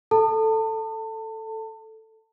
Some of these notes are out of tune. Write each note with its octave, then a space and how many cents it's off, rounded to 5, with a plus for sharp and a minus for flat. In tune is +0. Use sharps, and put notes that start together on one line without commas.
A4 +0 A5 +30